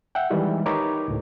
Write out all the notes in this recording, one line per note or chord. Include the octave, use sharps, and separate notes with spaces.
E5 F#5 G5
D#3 E3 G3 G#3
D#4 G4 A#4 B4 C#5 D6
D2 A2